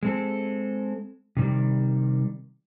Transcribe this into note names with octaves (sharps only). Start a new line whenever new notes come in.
G#3 C4 A4
C3 D#3 G3